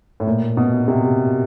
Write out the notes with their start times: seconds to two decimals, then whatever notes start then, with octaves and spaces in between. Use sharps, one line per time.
0.20 A2
0.27 A#2
0.57 B2
0.88 C3